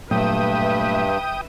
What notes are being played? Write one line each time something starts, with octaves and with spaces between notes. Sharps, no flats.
G2 A#2 F#3 A3 B4 E5 G5 D#6